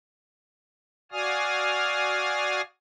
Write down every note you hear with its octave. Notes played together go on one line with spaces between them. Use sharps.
F#4 D5 F5 G#5 D#6 F6